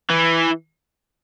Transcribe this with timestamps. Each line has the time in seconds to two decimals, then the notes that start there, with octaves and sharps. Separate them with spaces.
0.10 E3